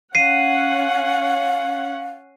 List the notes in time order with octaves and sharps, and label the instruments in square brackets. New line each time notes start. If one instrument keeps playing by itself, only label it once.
[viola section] C#4 F#5 [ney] F5 [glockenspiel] C7 D#7